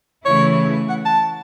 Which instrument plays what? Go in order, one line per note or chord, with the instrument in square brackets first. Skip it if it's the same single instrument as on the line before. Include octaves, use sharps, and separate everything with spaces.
[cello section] C#3 E3 A3 E4 [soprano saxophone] C#5
[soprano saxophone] F#5
A5